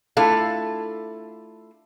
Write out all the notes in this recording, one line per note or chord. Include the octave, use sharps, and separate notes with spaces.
A3 D4 E4 F4 A4 F5